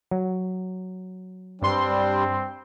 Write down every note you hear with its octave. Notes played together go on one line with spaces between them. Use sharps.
F#3
G2 G3 C4 D4 C6